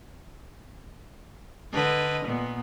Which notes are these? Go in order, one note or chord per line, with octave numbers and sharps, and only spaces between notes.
D3 B4 D#5
A#2 B3